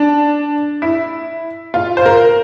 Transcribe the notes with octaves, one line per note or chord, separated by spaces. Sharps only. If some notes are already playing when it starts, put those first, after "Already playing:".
Already playing: D4
E4
F4
C5
A#4